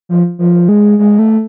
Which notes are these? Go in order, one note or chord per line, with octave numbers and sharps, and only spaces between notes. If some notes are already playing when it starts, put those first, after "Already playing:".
F3
F3
G#3
G#3
A3